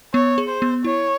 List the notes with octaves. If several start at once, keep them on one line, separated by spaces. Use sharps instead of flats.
B3 C#5
G#4
C5
B3
E4 C#5